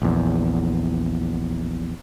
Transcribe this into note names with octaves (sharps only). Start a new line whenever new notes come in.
A#1 E2